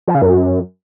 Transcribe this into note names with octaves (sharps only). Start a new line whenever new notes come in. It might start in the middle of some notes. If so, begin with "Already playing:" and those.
F3
C#3
F#2